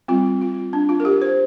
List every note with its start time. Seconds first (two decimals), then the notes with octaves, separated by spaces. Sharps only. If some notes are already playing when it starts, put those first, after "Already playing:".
0.08 G3 C4 F4
0.41 F4
0.73 D4
0.89 F4
1.00 A#4
1.05 G4
1.22 C5